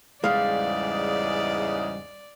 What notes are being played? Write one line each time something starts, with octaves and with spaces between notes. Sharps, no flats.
E2 G#2 C#3 G3 G#3 D5 F5